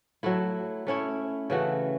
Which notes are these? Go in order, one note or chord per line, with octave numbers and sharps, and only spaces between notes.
F#3 A3 E4
A3 C#4 E4 C#5
C#3 E3 A3 F#4